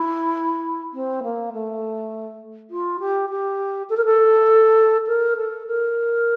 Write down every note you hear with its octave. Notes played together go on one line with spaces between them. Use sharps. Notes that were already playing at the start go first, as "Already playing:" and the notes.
Already playing: E4
C4
A#3
A3
F4
G4
G4
A4
A#4
A4
A#4
A4
A#4